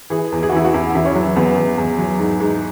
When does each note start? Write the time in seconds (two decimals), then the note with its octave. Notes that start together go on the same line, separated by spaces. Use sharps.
0.10 E3 G#4
0.32 E2
0.43 G#4
0.49 F#4
0.52 E3 E4
0.65 F#4
0.74 E2 E4
0.95 E2 E4
1.05 C#4
1.16 F#3
1.36 E2 B3
1.56 E2
1.78 E2
1.99 F#3
2.19 G#2
2.40 G#2